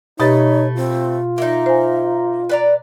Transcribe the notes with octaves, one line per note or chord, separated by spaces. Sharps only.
B2 A3 D#4 G4 B4 C#5 A6
C4 F4
A#3 D#4 E5
C5 G#5
B4 D5 A#5